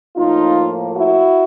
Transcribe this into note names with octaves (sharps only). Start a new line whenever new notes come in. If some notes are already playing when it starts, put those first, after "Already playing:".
A2 F3 A#3 D#4 F4
E4 F#4